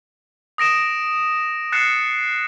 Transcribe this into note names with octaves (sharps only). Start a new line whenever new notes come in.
D#6 A#6 D7 E7
F#6 A6 C7 C#7 E7